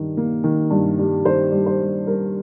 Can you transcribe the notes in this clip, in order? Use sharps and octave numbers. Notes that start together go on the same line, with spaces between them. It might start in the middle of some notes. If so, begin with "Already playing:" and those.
Already playing: G2 D#3
A#3
D#3
G2
G3
D#3 C5
G3
C5
G3
G3 A#4